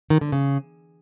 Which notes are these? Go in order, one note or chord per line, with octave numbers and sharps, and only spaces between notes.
D#3
D3
C#3